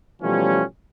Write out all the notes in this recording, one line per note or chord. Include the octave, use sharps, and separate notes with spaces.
B2 E3 F3 G3 A3 C#4